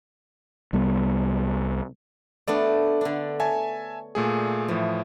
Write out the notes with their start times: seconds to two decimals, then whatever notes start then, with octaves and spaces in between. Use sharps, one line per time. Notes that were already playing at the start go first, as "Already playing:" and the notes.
0.73 C2 G3 B3
2.47 A3 B3 D4 D5
3.01 D3 D4
3.40 C#5 E5 G#5 A5
4.15 A#2 A3 G#4
4.68 A2 E3 F3